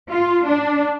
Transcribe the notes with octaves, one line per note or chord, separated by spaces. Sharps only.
F4
D4